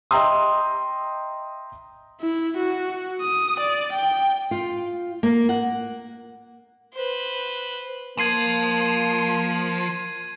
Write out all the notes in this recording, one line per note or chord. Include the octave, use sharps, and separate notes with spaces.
D#5 E5 G5 A#5 C6 D#6
E4
F#4
D#6
D5
G5
F4
A#3
F#5
B4 C5
F3 A#3 G#6 C7 D#7